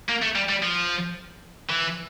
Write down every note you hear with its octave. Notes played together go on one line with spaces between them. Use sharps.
A#3
A3
G3
G3
F3
E3